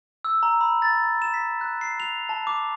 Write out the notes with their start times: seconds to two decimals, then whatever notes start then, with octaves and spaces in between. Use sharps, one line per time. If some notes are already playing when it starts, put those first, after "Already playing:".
0.25 E6
0.43 A#5
0.61 B5
0.82 A6
1.22 E7
1.34 B6
1.61 F#6
1.81 C7
2.00 F7
2.29 A5
2.47 D6